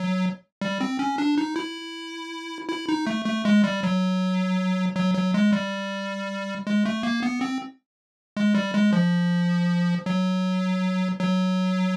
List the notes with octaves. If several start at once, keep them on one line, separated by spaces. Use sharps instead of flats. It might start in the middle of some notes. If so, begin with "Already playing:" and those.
Already playing: F#3
G3
C4
C#4
D4
D#4
E4
E4
D#4
A3
A3
G#3
G3
F#3
F#3
F#3
G#3
G3
G#3
A3
A#3
B3
C4
G#3
G3
G#3
F3
F#3
F#3